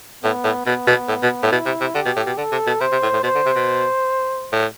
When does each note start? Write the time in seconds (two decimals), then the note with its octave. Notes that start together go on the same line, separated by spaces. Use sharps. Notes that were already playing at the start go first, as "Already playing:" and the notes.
0.23 A2 B3
0.44 A2
0.66 B2 B3
0.87 B2
1.08 A2
1.23 B2
1.43 A2
1.52 B2 E4
1.66 C3
1.81 C3
1.95 D3 G4
2.06 B2
2.17 A2
2.26 B2
2.38 D3 A4
2.52 C3
2.67 B2
2.80 C3 C5
2.92 C3
3.03 A2
3.13 A2
3.23 B2 C5
3.35 D3
3.46 C3
3.56 B2
4.52 A2